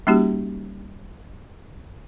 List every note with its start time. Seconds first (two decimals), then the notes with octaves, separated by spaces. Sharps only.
0.07 G3 A#3 C#4 D#4 F#4 G4